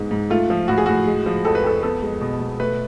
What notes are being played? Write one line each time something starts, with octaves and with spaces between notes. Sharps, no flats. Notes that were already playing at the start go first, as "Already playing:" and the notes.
Already playing: G#2 G#3 B3
G#2
A3 F4
F3
A2 F#4
G#4
A2 F#4
G#3
F3
F2 A4
B4
F2 A4
B3 A4
G#3
B2
B2
A3 B4